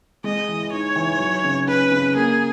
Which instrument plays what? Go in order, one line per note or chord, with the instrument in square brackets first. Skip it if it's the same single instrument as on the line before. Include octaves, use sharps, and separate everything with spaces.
[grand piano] G#3 [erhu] D#5
[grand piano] E3
[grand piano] D#4 [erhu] C#5
[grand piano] E3
F#3
C#3
[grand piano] C#4 [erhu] B4
[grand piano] C#3
[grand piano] A#3 [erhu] G#4